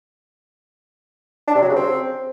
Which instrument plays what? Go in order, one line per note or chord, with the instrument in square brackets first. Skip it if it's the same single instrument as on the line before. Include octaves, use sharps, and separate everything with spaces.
[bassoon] D4
C3
F#3
C#3
C4